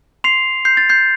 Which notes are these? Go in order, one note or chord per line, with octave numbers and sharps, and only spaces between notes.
C6 C7 F7
G6 C7
A6
G6 C7